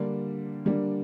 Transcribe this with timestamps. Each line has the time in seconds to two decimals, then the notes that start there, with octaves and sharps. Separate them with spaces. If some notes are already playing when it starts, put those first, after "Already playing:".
Already playing: D3 G3 A#3 D4
0.65 D3 G3 A#3 D4